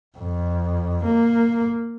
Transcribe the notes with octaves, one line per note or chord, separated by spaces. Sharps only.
F2
A#3